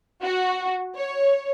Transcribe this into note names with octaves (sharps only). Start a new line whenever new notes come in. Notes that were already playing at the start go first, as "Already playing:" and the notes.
F#4
C#5